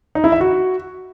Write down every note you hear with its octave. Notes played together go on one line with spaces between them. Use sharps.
D#4
E4
E5
F#4